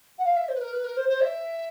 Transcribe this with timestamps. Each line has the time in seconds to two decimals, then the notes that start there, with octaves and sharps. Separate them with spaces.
0.18 F#5
0.24 F5
0.36 E5
0.48 C5
0.54 B4
0.61 A#4
0.72 B4
0.84 A#4
0.96 C5
1.08 C5
1.21 E5